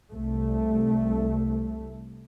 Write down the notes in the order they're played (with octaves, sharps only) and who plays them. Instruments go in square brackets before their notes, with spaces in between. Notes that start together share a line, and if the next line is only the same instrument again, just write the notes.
[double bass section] C2 A3